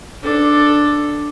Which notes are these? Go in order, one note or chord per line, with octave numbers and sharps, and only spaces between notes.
D4 A4